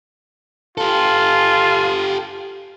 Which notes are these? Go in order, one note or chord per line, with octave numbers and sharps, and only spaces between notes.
F4 G4 A4